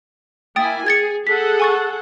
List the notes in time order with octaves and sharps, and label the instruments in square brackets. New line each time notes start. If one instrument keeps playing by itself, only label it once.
[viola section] A#3 E4 G#5 [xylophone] G5 D#6 A6
[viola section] G#4 [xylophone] G#6 A6 C#7
[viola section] G#4 A4 F#5 [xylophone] B6
[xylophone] G#5 C#6 A6